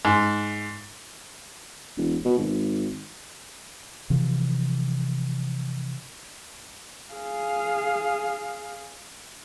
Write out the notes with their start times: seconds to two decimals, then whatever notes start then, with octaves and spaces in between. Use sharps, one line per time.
0.05 G#2
1.97 E1
2.25 B2
2.38 G#1
4.10 C3 E3 F3
7.12 G#4 F5